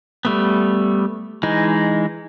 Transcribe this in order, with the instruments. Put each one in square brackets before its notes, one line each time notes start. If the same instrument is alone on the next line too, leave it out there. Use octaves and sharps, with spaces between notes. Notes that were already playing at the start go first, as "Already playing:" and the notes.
[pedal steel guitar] G3 A3 B3
E3 G#3 D#4